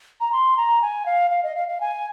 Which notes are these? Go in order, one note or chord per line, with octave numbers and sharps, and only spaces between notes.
A#5
C6
A#5
G#5
F5
F5
D#5
F5
F5
G#5